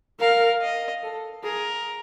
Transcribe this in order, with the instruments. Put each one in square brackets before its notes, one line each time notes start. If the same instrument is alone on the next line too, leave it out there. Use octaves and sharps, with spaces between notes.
[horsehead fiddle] A#4 [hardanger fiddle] F5
[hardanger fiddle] D#5
[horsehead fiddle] A4
[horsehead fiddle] G#4 [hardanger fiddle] A#4